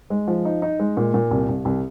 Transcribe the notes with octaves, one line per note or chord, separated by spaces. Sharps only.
G#3
F3
D#4
D#4
G#3
A#2
A#2
C2
C2
C2